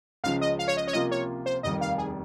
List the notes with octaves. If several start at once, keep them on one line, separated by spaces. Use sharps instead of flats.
C#2 C#3 F3 F5
D#5
F5
C#5
D#5
C#5
C3 F3 A#3 F4 D#5
C#5
C5
F1 D#2 D#3 G3 D#5
F5
G#4